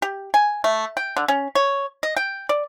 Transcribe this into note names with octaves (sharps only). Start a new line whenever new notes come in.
G4
G#5
A3
G5
D3
C#4
C#5
D#5
G5
D5